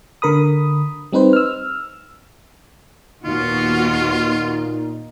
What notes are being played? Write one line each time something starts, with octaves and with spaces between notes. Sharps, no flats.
D3 A#4 B5 D#6
G3 C4 D#4 B4 C5
E6 F6
D#2 A#2 B3 D#4 F4 F#4